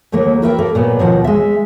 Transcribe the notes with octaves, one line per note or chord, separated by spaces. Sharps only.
D#2 F#3 A3 A#3
F#4 A#4 B4 E5 F5 G5
A#3 A4
A#2 F#3 B3
D#2 B2 F3 F#5
G#3 E5